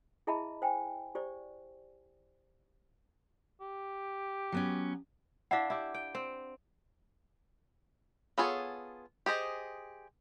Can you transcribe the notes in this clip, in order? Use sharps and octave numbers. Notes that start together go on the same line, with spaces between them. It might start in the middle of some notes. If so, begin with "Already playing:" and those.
E4 G#4 D#5 E5 A5 B5
C5 G5 G#5
G4 C5 D5
G4
F#3 B3 C#4
D4 E4 F5 F#5
E4 G4
G5
C4
B3 F4 G#4 A4 C#5
G4 G#4 C5 D#5